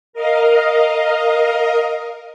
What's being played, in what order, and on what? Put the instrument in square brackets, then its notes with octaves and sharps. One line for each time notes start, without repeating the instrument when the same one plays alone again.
[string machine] A#4 D#5 F5